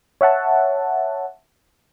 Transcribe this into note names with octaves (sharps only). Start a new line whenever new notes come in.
C#5 E5 F#5 A5